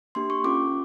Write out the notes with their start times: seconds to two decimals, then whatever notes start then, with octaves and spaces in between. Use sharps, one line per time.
0.15 A#3 D4 G4 C6
0.30 C#6
0.44 C#4 F4 A4 D6